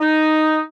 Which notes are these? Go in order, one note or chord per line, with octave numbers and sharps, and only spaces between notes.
D#4